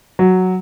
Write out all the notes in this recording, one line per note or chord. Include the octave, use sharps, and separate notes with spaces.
F#3